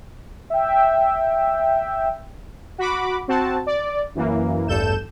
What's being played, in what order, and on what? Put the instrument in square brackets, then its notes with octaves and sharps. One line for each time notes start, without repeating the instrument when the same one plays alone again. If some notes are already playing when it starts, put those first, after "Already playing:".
[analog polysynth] E5 G5
F#4 B5 D6
C4 F#4 A5
D5
F#2 E3 A#3
A1 E2 G2 A4 G6 E7